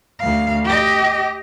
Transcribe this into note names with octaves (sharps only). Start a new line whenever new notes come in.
D2 F5
G4 D#5